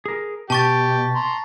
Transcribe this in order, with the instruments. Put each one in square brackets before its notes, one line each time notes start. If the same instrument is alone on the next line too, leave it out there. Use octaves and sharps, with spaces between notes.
[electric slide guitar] G#4 A#4
[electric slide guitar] B2 [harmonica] G4 [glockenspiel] A5 C#6 A6
[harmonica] A#5 C6